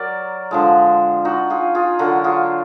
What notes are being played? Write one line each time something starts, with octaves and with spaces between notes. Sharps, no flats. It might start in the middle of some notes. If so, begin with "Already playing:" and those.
Already playing: F#3 A#4 D5
D3 F3 G#3
D#4 F#4
F4 G#4
F4 G#4
D3 F#3 F#4 A#4
F4 G#4